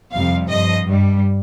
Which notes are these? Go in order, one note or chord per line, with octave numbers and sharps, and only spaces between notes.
F2 C3 G3 F5
G2 F3 D#5
G2 G3